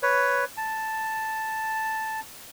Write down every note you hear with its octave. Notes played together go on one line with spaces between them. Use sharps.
B4 C#5
A5